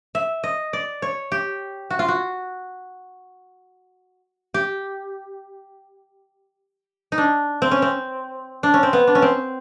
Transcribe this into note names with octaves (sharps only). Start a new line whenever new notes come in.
E5
D#5
D5
C#5
G4
F#4
F4
F#4
G4
D#4
D4
C4
C#4
C4
D4
C#4
C4
B3
D4
C#4
C4